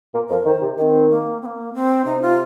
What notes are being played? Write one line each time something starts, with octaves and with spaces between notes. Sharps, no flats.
A#2 A#3
F2 F3 A#4
D#3 C5
C3
D#3 C4 D#4
A#3
C4
A#3
C4
C3 D#4
F4